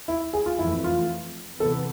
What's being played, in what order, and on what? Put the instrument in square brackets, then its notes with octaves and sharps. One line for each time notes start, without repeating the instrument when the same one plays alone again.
[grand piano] E4
G#4
F4
[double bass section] F2 E3 A3 [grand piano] E4
[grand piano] F4
[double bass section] C3 E3 B3 [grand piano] A4